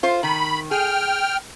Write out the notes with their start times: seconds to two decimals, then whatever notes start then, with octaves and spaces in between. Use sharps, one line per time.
0.03 F4 C5
0.23 D#3 B5
0.71 G#4 G5 F6